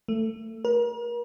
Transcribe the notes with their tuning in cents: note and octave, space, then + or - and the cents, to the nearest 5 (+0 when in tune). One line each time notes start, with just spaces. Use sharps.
A3 +20
A#4 +40